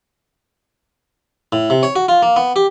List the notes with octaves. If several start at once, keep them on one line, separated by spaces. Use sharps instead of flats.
A2
C3
C#5
F#4
F4
A#3
B3
G4